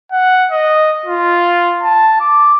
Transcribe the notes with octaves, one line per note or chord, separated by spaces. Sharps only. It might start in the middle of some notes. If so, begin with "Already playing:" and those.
F#5
D#5
F4
A5
D6